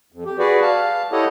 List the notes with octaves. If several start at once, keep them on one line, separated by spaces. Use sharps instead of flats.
F2
G4
F#4 G#4 B4 D5
F5 A5
E4 G4 A4 C#5 D#5 F#5